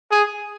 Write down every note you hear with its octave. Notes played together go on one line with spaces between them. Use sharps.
G#4